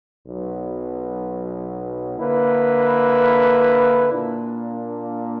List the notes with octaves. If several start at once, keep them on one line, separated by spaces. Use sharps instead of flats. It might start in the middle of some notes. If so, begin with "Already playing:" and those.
B1 B2 F#3
D3 A#3 E4 B4
A#2 A#3 D4